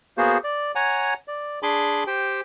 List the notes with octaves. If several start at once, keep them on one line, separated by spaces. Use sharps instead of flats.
A#3 B3 F#4 G#4 C5
D5
C#5 F#5 G#5 A#5
D5
D4 G#4 G#5 B5 C6 D6
G4 C5 G5